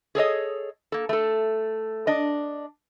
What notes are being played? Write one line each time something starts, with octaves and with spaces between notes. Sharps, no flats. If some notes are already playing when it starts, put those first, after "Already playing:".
G#4 A4 C#5 D#5
A#3 A4
A3 A4
D4 D#5